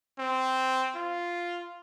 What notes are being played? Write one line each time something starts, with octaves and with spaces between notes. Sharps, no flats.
C4
F4